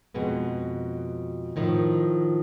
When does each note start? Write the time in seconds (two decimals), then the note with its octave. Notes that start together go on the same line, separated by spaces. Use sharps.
0.14 F2 B2 G#3 B3
1.56 A2 D#3 F3